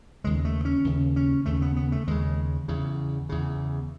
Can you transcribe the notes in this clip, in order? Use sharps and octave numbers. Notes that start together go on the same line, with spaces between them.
D#2 C#3 G#3
A3
C#4
D#2 C#3
C#4
D#2 C#3 A3
B3
B3
A3
D#2 C#3 G#3
E2 C#3
E2 C#3